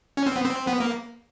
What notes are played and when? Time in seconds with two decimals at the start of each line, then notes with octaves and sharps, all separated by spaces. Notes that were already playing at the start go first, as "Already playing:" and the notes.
0.17 C#4
0.26 C4
0.36 B3
0.45 C4
0.67 B3
0.80 A#3